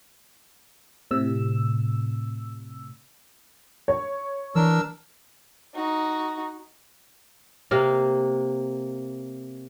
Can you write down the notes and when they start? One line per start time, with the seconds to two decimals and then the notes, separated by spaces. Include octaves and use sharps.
1.11 A2 C3 E6
3.88 C#5
4.55 E3 D4 A#4 E6
5.74 D#4 F#4
7.71 C3 A#3 F5